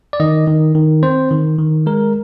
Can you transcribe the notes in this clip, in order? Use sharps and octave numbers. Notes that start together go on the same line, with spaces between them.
D5
D#3 D#5
D#3
D#3
C4 C5
D#3
D#3
G#3 A#4